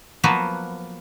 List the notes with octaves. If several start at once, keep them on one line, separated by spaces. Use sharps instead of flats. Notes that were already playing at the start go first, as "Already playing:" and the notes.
F3 F#3 A#3 B3 F#4 B4